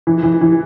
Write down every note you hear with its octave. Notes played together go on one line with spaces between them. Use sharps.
E3
E3
E3